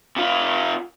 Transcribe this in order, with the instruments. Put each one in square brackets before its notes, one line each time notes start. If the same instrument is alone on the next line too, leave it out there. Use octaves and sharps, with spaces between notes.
[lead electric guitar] C3 F4